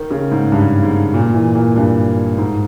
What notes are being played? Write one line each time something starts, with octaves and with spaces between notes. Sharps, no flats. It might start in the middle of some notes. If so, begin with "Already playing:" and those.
Already playing: D#3
C#3
G#2
G2
G#2
A#2
E3
A#2
G2
G#2